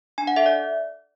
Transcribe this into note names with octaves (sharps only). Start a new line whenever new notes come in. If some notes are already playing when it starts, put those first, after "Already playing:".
D4 G#5
F#5
A4 E5
D5